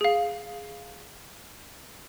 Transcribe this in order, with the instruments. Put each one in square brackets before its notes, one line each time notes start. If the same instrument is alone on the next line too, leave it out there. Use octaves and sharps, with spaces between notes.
[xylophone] G#4 F5